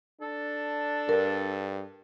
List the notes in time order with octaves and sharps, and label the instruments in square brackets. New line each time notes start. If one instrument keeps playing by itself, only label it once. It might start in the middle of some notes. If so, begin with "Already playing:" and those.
[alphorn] D4 [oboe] A4
[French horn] G2 [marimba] A#4